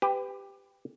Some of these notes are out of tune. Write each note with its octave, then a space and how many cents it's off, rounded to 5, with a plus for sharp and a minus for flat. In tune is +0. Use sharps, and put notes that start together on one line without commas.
G4 +10 B4 +30